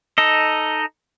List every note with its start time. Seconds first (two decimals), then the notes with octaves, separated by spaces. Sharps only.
0.18 D#4 A4 D#5